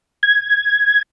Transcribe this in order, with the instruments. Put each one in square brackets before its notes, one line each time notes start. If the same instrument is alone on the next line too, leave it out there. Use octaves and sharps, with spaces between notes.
[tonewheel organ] G#6